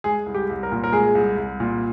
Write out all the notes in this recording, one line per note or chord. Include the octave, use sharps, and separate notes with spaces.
G#3 G#4
C2
G4
C2
A#4
A#2
A#4
G#3 G#4
C2
C2
A#2